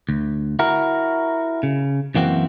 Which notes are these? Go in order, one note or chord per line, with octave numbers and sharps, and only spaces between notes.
D2
E4 F#4 A#4
C#3
F#2 E3 A#3 C4 F#4